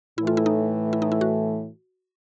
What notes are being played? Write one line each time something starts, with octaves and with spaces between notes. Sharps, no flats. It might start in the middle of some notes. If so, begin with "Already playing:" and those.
A2 E3 A3 E4
F4
E4
D#4
E4
D#4
E4
F#4